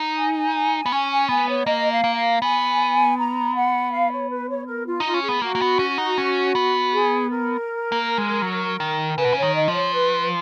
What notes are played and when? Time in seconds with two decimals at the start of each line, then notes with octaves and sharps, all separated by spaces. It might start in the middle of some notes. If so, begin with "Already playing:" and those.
Already playing: D#4
0.17 G#5
0.86 B3
0.92 C#4 G#5
1.10 G#5
1.29 B3 G#5
1.49 C#5
1.66 A#3 D#5
1.91 F5
2.04 A#3
2.16 F5
2.41 B3 G#5
3.17 A#5
3.55 F#5
3.92 F5
4.11 C#5
4.30 B4
4.49 C#5
4.67 A#4
4.86 F4
5.00 D#4 F4
5.14 C#4
5.23 G#4
5.29 B3
5.42 A#3 F#4
5.55 A#3
5.61 B3
5.79 C#4
5.98 D#4
6.18 C#4
6.55 B3
6.93 G#4
7.29 A#4
7.92 A#3
8.18 G#3
8.42 F#3
8.80 D#3
9.18 C#3 B4
9.24 B2
9.33 C#3 C#5
9.43 D#3
9.54 D#5
9.68 F3
9.74 C#5
9.93 B4